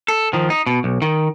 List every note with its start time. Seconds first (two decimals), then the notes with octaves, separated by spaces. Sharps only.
0.08 A4
0.33 D#3 F3
0.50 D#4
0.67 B2
0.84 B1
1.02 D#3